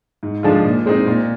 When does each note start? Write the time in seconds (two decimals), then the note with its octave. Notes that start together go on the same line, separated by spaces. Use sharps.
0.23 G#2
0.43 F3 G#3 D4 F4
0.65 A#2
0.86 G#3 C4 D#4
1.06 A#2